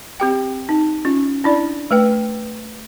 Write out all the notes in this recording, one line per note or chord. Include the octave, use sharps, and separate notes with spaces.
C4 G4 G5
D#4
C#4 F4
D4 E4 D5
A3 B4 G5